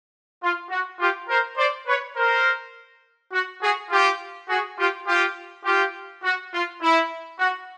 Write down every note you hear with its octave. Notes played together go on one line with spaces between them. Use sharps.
F4
F#4
F4 G4
A#4 C5
C5 D5
B4 C#5
A#4 C5
F#4
F#4 G#4
F4 G4
F#4 G#4
F4 G4
F4 G4
F4 G4
F#4
F4
E4
F#4